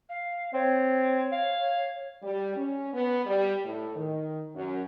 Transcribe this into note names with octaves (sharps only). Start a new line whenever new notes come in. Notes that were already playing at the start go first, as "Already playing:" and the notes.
F5
C4 C#5
F5
G3
C#4
B3
G3
A2
D#3
F#2